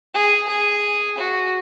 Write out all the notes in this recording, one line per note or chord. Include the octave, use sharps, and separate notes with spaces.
G#4
G#4
F#4